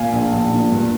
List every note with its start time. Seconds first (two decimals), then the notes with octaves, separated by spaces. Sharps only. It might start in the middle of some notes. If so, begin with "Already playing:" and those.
Already playing: A#2 F5 G#5
0.13 A#1
0.32 A#1
0.51 A#2
0.72 G2